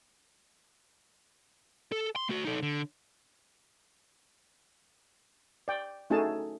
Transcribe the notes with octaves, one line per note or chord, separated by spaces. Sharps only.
A4
C6
A3 F#4
D#4 A4
D3
D5 G5
A3 C#4 D#4 F#4 G#4 A5